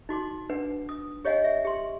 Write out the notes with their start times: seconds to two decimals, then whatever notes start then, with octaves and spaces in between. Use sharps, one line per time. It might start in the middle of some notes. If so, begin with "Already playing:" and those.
0.09 D#4 F#4 C6 D6
0.50 D4 B4 F#5
0.89 D#6
1.25 G4 C#5 D#5 F5 F#5 G#5
1.44 E5
1.65 G4 C6